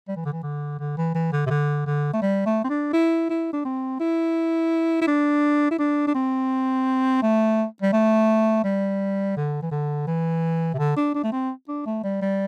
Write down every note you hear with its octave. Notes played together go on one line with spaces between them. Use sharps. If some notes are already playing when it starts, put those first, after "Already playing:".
G3
E3
D3
E3
D3
D3
E3
E3
D3
C3
D3
D3
A3
G3
A3
C4
D4
E4
E4
D4
C4
E4
E4
D4
E4
D4
D4
C4
A3
G3
A3
G3
D3
E3
D3
E3
C3
D3
D4
D4
A3
C4
D4
A3
G3
G3